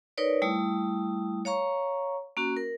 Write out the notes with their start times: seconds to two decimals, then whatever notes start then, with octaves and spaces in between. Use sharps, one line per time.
0.18 D#4 A#4 B4 C#5 D5
0.42 G3 A3 E4 D#6
1.45 C#5 F5 A#5 C#6
2.37 A#3 C#4 F#4
2.57 A#4